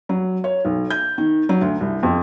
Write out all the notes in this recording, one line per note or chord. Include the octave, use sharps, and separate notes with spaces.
F#3
C#5
B1
G6
D#3
F#3
D2
C2
F2